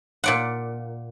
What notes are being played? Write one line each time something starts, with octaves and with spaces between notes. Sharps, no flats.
A#2 D5 F#5